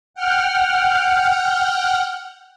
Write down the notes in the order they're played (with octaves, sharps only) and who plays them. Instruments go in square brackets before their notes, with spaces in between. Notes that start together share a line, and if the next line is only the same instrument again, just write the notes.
[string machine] F#5 G5 F6